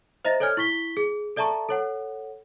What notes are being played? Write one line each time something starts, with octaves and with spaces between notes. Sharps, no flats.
C5 D#5 E5 A#5 A6 A#6
A4 C#5 D5 G#5 F6 G#6
E4 C#6 B6 G7
G#4
A4 D5 E5 A5 A#5 C#6
A4 C#5 F#5